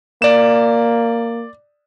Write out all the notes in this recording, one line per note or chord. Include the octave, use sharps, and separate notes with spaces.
A#3 D5 E7